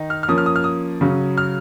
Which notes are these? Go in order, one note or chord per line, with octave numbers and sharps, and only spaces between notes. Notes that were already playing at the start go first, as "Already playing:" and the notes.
Already playing: D#3 D#4
F6
F6
F3 A#3 C#4 D#6
F6
D#6
F6
D#6
C#3 F#3 C#4
F6